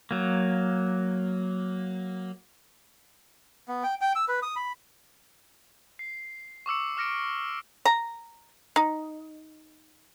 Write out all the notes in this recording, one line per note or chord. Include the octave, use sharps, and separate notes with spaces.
F#3 A#3
B3
G5
G5
E6
B4
D#6
B5
C7
C#6 D6 E6 C#7
D6 F6 A#6 C#7 D7
A#5
D#4